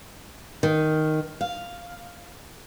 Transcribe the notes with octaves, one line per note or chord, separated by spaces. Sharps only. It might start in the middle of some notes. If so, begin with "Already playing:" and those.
D#3
F5